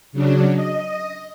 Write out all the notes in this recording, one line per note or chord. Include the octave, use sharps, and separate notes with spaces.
C#3 F#3 D4
D#5